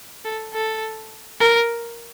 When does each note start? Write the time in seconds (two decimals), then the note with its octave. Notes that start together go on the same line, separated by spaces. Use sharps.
0.25 A4
0.54 A4
1.40 A#4